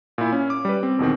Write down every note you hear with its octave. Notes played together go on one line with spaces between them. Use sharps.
A#2 E4
C#4
D6
G3 B4
C4
E2 B2 D#3 C4